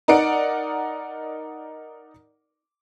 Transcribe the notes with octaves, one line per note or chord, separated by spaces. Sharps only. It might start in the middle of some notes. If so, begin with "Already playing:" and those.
D#4 A#4 D5 F#5 D7